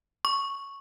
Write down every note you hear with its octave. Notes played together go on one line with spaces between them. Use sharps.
C#6